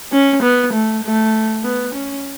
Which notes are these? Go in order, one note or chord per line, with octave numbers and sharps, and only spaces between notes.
C#4
B3
A3
A3
B3
C#4